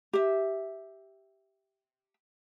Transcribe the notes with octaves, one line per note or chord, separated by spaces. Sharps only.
G4 E5